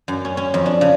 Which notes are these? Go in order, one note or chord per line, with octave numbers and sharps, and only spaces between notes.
F#2
C#4
C#4
F2
D4
C#3